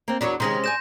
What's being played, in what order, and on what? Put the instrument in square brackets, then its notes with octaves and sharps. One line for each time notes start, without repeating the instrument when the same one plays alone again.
[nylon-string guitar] A#3 C4
[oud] E2 F#3 D4 [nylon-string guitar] A#4 C#5
[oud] C3 G#3 C#4 [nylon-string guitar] D#3 [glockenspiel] C6 A#6
[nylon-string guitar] D5 G#5 [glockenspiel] G6 A#6 E7